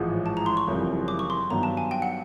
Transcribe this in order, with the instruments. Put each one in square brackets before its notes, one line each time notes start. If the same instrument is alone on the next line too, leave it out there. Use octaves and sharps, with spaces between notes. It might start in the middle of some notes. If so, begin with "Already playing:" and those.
Already playing: [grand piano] A1 G#2 F3 G#3 [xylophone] F#5
[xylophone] A5
A#5
C6
C#6
[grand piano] F#1 F2 C#3 E3 G3
[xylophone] D6
C#6
C6
[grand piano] G2 D#3 F#3 B3 [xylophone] A#5
[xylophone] A5
G#5
G5
F#5